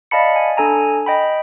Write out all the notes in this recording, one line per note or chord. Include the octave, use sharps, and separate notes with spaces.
D5 D#5 F5 A5 B5 C#7
G#5
D4 A4 G#5 A#5
D#5 G5 B5